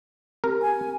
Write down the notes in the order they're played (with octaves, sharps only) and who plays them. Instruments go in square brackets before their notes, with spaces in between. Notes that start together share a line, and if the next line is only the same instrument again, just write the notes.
[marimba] C4 G4 [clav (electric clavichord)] A#4
[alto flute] G#5